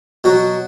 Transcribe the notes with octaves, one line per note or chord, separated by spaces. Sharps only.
B2 F#3 F#4